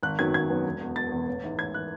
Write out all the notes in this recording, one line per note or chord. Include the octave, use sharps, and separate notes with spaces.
G#1 F#6
F#2 D#3 F#3 B3 G#6
G#1 G#6
F#2 D#3 F#3 B3
E1
E2 B2
E1 A6
E2 B2
A1
G#2 E3
A1 G#6
E3 F#6